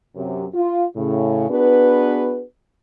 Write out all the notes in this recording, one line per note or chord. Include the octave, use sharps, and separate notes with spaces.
F#2 C3
F4
A2 C#3
B3 D4 F#4 G#4 B4